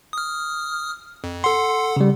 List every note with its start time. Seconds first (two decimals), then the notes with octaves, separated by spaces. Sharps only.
0.13 D#6 F6
1.24 F2
1.44 A4 F#5 C6
1.97 C#3 G3